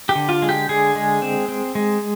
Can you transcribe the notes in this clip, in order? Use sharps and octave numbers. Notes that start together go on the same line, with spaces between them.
G4
D3
F4
G#3
G4
D3 G#4
G#3
C4
C4
G#3